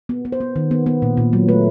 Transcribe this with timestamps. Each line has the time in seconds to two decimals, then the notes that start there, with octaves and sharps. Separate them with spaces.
0.09 B3
0.25 B3
0.32 C5
0.41 B3
0.56 D#3
0.71 B3
0.86 B3
1.02 A#2
1.17 A#2
1.33 F#3
1.49 A3 B4